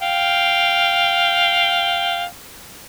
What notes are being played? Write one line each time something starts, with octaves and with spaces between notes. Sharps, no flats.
F5 G5